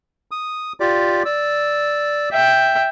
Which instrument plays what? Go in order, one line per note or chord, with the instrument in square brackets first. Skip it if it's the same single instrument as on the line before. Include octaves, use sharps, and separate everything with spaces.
[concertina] D#6
F4 G4 D5
D5 E6
[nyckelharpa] E5 G5